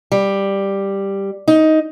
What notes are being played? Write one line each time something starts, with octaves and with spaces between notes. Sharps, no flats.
G3
D#4